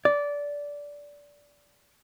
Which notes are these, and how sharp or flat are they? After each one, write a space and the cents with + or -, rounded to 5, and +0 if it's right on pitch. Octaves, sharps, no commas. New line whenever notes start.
D5 -15